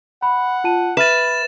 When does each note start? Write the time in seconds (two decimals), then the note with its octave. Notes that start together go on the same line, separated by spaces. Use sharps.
0.22 F#5 B5
0.64 F4 A5 D#7
0.97 B4 E5 F6 A6 D#7 E7